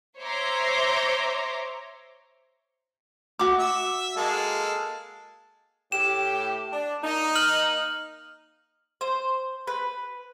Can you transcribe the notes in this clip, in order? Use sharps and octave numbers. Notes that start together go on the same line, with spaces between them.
C5 C#5 E5 A#5 C6 D6
F#4 D6
E5
G#3 A#3 A4
A2 G4 E7
D4
A#3 D#4
F6 F#7
C5
B4